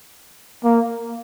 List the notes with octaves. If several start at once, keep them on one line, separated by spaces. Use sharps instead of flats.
A#3